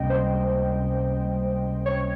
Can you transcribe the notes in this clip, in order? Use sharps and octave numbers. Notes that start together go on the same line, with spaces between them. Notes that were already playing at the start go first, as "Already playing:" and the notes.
Already playing: C#2 C3 G3 A#3 C#4 D#5 G5
C5
C#5